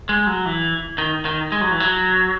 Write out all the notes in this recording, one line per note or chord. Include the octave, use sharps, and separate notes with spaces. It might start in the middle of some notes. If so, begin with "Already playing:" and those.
G#3
F#3
E3
D#3
D#3
G#3
F#3
E3
F#3